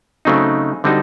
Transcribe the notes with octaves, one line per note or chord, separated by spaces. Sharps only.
C#3 F#3 A3 C4 D#4
D3 G3 C4 D#4 F#4